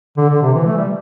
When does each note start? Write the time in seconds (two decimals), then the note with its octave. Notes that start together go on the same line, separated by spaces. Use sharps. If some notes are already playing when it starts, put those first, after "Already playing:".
0.17 D3
0.30 D3
0.42 C3
0.54 E3
0.66 A3
0.77 G3